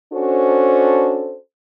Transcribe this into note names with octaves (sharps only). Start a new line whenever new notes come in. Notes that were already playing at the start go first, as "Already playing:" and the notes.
C#4 D4 F#4 A4 C5